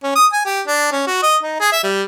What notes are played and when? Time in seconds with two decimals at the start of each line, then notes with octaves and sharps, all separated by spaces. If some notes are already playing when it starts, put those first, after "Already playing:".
0.03 C#4
0.15 D#6
0.33 G#5
0.45 G4
0.67 D4
0.92 C#4
1.07 F#4
1.22 D#5
1.43 D#4
1.60 G#4
1.72 E5
1.83 G3